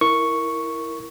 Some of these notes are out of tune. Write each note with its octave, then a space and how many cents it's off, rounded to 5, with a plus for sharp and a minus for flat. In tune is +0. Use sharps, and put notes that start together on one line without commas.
E4 +0 A#4 +0 C#6 +0